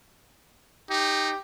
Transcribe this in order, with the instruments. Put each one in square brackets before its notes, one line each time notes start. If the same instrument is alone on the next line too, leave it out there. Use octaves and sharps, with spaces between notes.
[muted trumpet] D#4 [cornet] G4